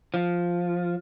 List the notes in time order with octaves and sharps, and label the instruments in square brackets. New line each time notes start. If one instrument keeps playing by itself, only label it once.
[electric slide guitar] F3